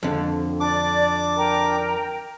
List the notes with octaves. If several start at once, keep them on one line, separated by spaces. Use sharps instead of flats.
F2 D3
D4 D5 D6
A#4 G5 A#5